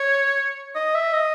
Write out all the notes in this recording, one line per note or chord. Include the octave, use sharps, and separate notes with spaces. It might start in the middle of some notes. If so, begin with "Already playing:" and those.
Already playing: C#5
D#5
E5
D#5